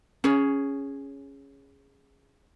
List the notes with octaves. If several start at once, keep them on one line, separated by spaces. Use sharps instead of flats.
C#4 G#4 C#5